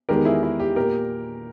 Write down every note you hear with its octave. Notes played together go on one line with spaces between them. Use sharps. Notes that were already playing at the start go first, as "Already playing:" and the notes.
E2 D#3 G#3 B3 G4 A#4
E4 G#4
E4
G4
A#2 A#3 G4 A#4